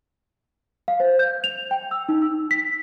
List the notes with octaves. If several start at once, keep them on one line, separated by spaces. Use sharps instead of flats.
F5
C5
G6
F7
G5
E6
D#4
E6
B6